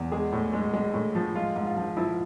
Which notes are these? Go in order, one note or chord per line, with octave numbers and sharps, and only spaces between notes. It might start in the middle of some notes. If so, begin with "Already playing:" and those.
Already playing: E2
G#3 G#4
A2
G#3
G#3
A2
F3
G#3 F4
G#2
F4
F3
F3 E4